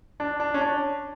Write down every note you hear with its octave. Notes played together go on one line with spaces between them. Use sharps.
D4
D4
C#4
D4